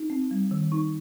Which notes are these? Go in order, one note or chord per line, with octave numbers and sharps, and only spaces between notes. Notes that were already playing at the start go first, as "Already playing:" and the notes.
Already playing: D#4
C4
G3
D#3
D#4 C#6